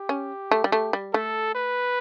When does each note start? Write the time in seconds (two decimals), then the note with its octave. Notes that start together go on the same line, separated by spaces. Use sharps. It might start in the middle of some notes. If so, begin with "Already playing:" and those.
Already playing: G4
0.09 C#4
0.51 A3
0.64 G3
0.72 A3
0.93 G3
1.13 A3 A4
1.55 B4